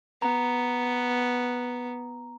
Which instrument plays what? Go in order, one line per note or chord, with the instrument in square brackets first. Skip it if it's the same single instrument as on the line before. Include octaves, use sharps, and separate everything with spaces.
[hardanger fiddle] B3 [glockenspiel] A#5